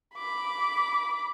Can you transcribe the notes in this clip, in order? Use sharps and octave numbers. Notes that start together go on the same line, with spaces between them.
B5 D6